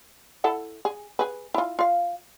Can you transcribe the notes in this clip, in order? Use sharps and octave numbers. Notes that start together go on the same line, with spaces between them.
E4 A4 F#5
G#4
G#4 B4
E4 F4
F4 F5